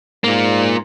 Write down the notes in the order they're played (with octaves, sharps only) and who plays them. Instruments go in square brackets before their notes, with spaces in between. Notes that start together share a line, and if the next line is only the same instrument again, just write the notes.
[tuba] G#2 [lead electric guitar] A#3 F4